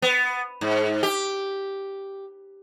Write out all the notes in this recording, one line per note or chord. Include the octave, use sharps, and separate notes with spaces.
B3
G#2
G4